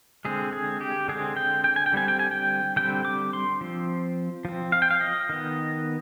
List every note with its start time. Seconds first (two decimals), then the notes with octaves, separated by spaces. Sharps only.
0.25 D3 G#3 C4 G#4
0.53 G#4
0.81 G4
1.08 D3 G#3 C4 G#4
1.37 G5
1.64 G5
1.76 G#5
1.86 G5
1.92 D3 G3 C4 G#5
2.08 G5
2.19 G#5
2.31 G5
2.76 D3 G3 C4 G5
3.05 D6
3.33 C6
3.61 F3 C4
4.45 F3 C4
4.72 F5
4.82 G5
4.91 F5
5.01 D#5
5.29 D#3 B3